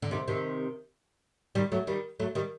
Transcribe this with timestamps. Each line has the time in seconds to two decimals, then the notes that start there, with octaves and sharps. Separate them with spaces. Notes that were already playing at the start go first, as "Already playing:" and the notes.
0.02 D3
0.11 C3 D#3
0.28 C3 D#3
1.55 D#3 G3
1.72 F#3 A3
1.87 D#3 G3
2.20 F#3 A3
2.35 D#3 G3